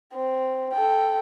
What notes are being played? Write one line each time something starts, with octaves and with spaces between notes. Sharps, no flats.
C4
A4 G5